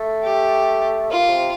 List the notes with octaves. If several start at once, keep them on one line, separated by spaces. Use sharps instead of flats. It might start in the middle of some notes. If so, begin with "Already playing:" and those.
Already playing: A3
G4
A#3 F4
C3